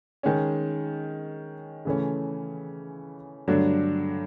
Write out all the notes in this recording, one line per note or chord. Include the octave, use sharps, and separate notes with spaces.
D#3 G#3 C#4
C#3 E3 A3 C#4
G2 D3 F#3 A3 D4